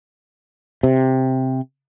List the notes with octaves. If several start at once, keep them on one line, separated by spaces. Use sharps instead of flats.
C3